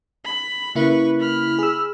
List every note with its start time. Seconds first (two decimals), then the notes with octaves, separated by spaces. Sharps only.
0.24 B5
0.75 C#3 A#3 E4 B4 C#6
1.20 B5 F6
1.59 G#4 E6